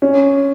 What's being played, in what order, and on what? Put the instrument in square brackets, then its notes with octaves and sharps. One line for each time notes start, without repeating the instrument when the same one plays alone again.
[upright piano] C#4